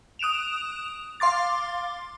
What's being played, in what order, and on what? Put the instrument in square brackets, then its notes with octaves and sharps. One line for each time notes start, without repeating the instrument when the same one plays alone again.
[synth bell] D#6 F#6 D7 E7 F7
F5 C6 D6 A6